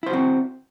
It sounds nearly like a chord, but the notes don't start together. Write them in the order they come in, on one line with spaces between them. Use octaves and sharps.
E4 C5 F#4 C4